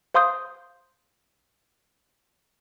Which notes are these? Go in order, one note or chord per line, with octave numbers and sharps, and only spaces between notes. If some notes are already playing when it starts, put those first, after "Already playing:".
C5 F5 C6 D#6 G6